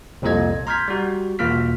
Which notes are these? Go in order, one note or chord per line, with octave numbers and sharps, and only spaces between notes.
C2 F2 A#2 A4 D#5 G#6
A#5 C6 F6 G6 G#6 B6
G3 F#4
E2 B2 A#3 F4 F6 B6